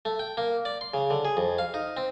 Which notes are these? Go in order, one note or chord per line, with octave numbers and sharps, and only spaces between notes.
A3
G5
A#3
D5
C6
C#3
D3
G#4
F2
F5
D#4
C4